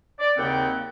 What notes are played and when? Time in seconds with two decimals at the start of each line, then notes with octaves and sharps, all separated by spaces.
0.19 D5
0.37 D#2 C#3 A#3 C4 F#5 G5